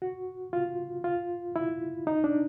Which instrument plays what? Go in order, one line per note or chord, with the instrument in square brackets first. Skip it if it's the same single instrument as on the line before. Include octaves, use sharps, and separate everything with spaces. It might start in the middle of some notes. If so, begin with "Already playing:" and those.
[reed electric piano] F#4
F4
F4
E4
D#4
D4